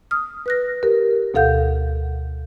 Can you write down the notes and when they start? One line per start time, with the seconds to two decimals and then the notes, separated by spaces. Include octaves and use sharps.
0.11 D#6 F6
0.46 B4 F#6 A#6
0.83 G4 A#4
1.34 D2 B2 A4 F5 F#5 G6